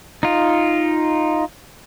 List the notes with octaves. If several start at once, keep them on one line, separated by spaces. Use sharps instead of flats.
D#4 F4